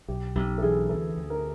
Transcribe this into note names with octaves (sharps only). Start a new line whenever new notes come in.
B1 G4
B1 G4
A4
E3 G#4
D2 A4
D2
A#4